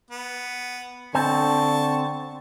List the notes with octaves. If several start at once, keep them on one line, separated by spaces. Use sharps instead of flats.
B3
D3 C4 A5 C#6